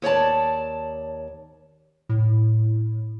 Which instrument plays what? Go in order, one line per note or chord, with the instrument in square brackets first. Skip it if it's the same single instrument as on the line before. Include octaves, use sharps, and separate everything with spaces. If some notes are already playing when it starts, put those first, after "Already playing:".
[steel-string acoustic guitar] D#2 C#5 D5 A5
[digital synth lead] A2